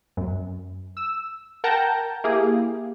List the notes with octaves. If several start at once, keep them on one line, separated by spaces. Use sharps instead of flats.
F#2
E6
A#4 F#5 G5 A5 A#5 G6
A#3 E4 G4 G#4